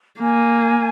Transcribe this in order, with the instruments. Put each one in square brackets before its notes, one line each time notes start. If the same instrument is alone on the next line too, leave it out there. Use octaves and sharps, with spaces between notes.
[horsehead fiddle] A#3 [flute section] G#5